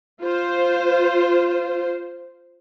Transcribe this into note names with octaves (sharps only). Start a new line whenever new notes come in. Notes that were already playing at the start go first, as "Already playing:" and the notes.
F4 C5